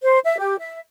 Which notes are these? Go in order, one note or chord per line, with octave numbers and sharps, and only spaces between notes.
C5
E5
G4
E5